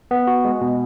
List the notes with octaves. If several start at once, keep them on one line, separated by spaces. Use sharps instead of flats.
B3
F#4
G#3
B2